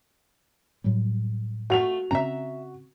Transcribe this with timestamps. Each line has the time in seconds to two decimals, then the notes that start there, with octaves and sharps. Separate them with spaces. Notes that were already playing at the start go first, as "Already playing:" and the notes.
0.84 A2 F#3 G3
1.70 A3 F4 F#4 F7
2.11 C#3 C4 C#4 E5 A#5